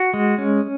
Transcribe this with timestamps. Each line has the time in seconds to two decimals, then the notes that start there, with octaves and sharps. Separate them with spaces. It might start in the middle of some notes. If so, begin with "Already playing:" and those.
Already playing: F#4
0.14 G#3
0.38 C#4